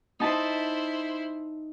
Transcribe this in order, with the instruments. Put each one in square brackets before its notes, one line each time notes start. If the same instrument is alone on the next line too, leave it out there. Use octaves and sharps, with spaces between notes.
[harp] D#4 A5 [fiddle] E4 C5